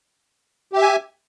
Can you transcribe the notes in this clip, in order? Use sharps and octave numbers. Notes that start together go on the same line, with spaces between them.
G4 E5 G#5